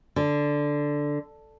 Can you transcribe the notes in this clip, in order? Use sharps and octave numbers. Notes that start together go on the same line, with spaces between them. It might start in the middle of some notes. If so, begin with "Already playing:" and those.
D3